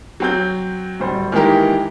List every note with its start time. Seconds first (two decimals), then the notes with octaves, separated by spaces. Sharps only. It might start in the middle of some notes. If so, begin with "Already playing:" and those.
0.20 F#3 C4 G6
1.00 D1 G3 C5
1.32 D#3 E3 G#3 A#3 G4 A#4